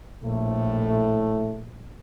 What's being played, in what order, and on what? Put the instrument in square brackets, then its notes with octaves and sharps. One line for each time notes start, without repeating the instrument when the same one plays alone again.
[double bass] A#1 [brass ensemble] A2 A3